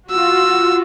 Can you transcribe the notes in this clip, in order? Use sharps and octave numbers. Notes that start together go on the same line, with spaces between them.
F4 F#4 E6